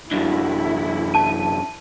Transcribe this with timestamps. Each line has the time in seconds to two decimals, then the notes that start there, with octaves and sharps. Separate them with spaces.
0.11 F#2 D3 E4
1.14 A5 D#7